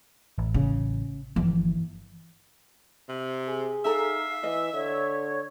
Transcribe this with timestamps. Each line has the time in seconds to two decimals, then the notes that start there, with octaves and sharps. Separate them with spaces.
0.38 A1
0.54 C#3
1.36 G1 E3 F3 A#3
3.09 C3
3.48 G#4
3.85 D#4 A4 E5 F5 A#5
4.43 E3 D#5
4.74 D3 C#5